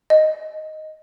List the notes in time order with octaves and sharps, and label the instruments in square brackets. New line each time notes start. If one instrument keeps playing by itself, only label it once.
[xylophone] D#5